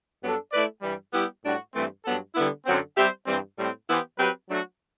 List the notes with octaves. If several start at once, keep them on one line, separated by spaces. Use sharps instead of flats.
G2 F#3 B3 D4 A4
A3 E4 B4 D5
G2 E3 G3
G3 B3 E4 G4
A2 G3 D4 F#4
G2 E3 A3 C4
G2 F#3 B3 D4 A4
D3 G3 B3 E4
F#2 D3 F#3 C4
G3 C4 G4 C5 E5
G2 E3 G3 C4
A2 G3 C4
E3 B3 E4 G4 C5
F#3 C4 G4 B4
F#3 A3 D4 F#4